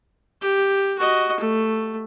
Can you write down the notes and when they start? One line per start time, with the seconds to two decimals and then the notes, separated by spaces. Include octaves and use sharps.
0.42 G4
0.99 F#4 D#5
1.40 A3